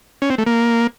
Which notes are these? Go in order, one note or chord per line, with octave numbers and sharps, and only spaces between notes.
C#4
C4
A3
A#3